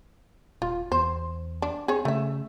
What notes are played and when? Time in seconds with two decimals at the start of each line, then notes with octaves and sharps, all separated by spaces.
0.62 D#1 F4
0.92 E2 C5
1.62 D4
1.88 C4 G#4 C#5
2.05 C#3 A3 E5